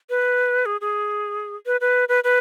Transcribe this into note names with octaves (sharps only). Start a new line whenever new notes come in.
B4
G#4
G#4
B4
B4
B4
B4